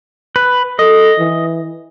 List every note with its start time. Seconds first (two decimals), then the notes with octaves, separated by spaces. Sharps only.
0.36 B4
0.79 A4 D#5
1.19 E3